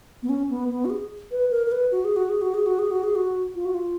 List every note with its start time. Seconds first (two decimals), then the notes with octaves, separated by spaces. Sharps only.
0.23 B3
0.29 C#4
0.50 B3
0.70 B3
0.85 F#4
0.90 G#4
1.31 B4
1.51 A#4
1.66 A#4
1.72 B4
1.92 F#4
2.05 G#4
2.16 F#4
2.29 G#4
2.42 F#4
2.54 G#4
2.66 F#4
2.79 G#4
2.91 F#4
3.03 G#4
3.15 F#4
3.55 F4
3.65 F#4
3.75 F4